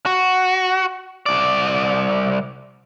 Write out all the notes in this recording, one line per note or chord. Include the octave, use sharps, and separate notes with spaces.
F#4
C2 D5